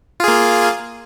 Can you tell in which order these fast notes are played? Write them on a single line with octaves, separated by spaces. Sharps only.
F4 G#4 A#3